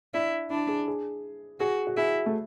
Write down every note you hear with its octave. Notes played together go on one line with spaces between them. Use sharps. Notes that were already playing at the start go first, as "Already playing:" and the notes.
D4 E4
D4 E4
G#4
G#4
F#4 G#4
F#4
E4 G#4
A3